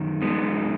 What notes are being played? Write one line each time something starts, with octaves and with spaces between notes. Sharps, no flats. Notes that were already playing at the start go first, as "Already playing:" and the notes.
Already playing: F#2 D#3
G#3 B3